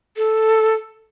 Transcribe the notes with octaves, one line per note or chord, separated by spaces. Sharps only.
A4